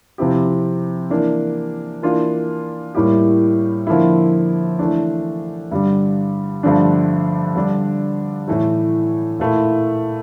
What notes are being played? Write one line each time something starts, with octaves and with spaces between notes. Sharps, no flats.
C3 F3 C4 E4 G4
E3 A#3 D4
E3 A#3 D4 F4
A2 G3 A#3 E4 G4
D3 F3 A#3 E4
E3 A3 D4
G2 D3 G3
G2 D3 F3 A3 D4
D3 G3 D4
A2 E3 A3
A#2 A3 E4